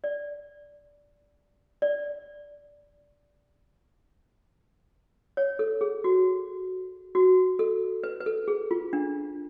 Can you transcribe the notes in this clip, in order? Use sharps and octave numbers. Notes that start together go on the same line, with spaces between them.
D5
D5
C#5
A4
G#4
F#4
F#4
A4
B4
B4
A4
G#4
F4
D4